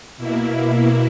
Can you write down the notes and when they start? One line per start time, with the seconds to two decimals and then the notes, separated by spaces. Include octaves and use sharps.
0.18 B2 A#3 E4